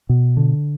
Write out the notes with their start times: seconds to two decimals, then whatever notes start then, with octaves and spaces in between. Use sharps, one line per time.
0.09 B2
0.37 D3